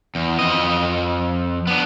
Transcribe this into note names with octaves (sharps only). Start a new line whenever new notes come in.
E2
F2 D#5
B3 D4